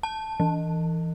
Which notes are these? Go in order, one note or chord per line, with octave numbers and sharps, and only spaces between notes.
A5
E3